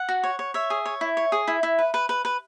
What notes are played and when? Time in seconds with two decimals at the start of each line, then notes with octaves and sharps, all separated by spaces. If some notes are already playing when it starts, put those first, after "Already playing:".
Already playing: F#5
0.09 F#4
0.24 C#5
0.39 C#5
0.54 C#5 E5
0.70 G#4
0.86 C#5
1.01 E4
1.17 C#5
1.32 G#4
1.48 E4
1.63 E4
1.79 B4
1.94 B4
2.09 B4
2.25 B4